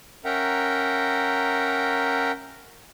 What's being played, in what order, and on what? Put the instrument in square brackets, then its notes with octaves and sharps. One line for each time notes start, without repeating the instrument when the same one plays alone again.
[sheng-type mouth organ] C#4 A#4 E5 F#5 G5 A#5